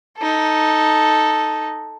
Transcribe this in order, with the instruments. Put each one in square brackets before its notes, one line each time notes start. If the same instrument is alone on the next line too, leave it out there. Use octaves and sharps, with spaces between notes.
[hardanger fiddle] D#4 A4